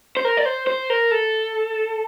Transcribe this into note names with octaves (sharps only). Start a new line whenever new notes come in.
C5
A#4
D5
C5
C5
A#4
A4